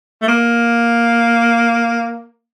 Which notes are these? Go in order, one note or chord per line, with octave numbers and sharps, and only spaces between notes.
A3
A#3